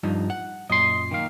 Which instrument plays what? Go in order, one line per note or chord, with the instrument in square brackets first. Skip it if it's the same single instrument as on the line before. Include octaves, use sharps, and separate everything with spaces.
[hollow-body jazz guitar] G2 F3 D#4
F#5
[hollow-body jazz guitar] F#2 A#2 [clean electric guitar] D#5 C6
[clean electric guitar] D#3 A#3 F5